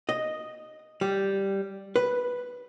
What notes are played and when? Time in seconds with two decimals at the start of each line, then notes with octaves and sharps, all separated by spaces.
0.09 D#5
1.01 G3
1.96 B4